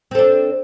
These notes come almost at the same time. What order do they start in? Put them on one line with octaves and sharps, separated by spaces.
C4 A4 D4